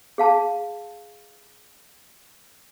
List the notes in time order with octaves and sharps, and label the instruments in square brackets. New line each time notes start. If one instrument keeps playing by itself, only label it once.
[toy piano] G#4 F5 A5